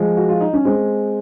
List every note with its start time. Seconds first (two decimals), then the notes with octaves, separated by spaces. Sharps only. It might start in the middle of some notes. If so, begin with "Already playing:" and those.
Already playing: F3 G#3
0.17 F#4
0.29 F4
0.40 D#4
0.53 C#4
0.65 G#3 C4